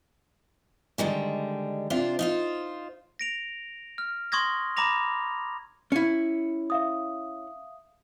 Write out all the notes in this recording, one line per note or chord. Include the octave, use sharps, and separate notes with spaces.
D3 D#3 G3 G#3
C3 D4 F4 C5
D#4 F4 C5
A#6 D7 F7
F6
C6 C#6 D#6 G#6 A#6
A#5 B5 D6 A#6 F7
C#4 E4 C#7
E5 F5 D#6